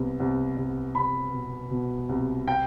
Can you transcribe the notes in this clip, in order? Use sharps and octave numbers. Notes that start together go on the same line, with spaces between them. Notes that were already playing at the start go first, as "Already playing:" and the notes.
Already playing: C2 B3
C2
C2
C2 B5
B2
B2
C2
G5